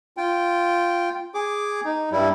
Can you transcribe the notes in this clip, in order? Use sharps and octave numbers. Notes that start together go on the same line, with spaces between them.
F4 G5
G#4 D6
D#4
G2 G3 E4